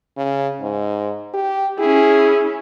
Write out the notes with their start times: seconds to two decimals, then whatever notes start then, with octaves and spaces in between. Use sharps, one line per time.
0.17 C#3
0.61 G#2
1.34 G4
1.79 C#4 E4 G#4